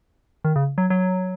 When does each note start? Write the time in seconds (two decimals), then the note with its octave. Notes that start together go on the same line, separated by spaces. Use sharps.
0.45 D#3
0.56 C#3
0.78 F#3
0.90 F#3